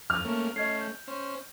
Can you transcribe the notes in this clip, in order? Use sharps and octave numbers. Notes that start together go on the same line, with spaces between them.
F2 F6
A3 A#3 C#4
A3 C#4 D#5 G#6 C7
G6
C#4 C5